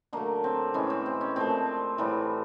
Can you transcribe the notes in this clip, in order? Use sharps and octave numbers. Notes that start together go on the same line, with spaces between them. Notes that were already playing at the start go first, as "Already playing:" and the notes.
D3 F#3 A3 A#3
C4
A2 E3 G#3 C#4
C4
C4
C#4
A#2 F3 A3 C4
A2 E3 G3